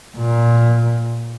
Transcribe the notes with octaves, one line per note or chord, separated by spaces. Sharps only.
A#2